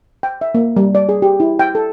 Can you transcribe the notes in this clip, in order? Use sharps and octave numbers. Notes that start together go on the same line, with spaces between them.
G5
E5
A#3
G3
D5
G#4
G4
E4
G5
A4